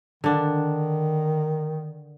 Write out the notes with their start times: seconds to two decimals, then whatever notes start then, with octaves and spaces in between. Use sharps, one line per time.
0.24 D3 D#3 D4